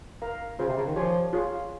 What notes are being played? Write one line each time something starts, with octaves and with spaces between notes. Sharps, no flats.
A#4 F5 A#5
C#3 C#4 F4 C5
C3
C#3
D#3
F3 G4 C#5 G#5 C6
F4 G#4 C#5